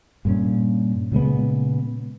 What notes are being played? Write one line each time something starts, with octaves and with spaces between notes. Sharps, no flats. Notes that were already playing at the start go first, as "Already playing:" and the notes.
G2 A#2 C#4
A#2 C#3 G#3 B3